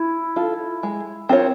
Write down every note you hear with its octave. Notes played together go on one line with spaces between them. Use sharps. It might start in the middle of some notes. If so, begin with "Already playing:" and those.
Already playing: E4
F4 A4
G#3
C4 F4 A#4 C#5